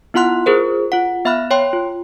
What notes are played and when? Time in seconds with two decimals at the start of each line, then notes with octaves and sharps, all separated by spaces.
0.14 B3 E4 F4 F#5 C6 F#6
0.46 F4 G#4 A#4 C5
0.92 F4 F#5
1.25 B3 E5 F5 B5 F6 F#6
1.51 C#5 G5 C6
1.73 F4